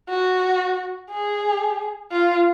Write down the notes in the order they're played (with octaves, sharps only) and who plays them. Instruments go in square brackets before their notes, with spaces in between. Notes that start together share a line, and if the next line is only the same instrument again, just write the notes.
[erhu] F#4
G#4
F4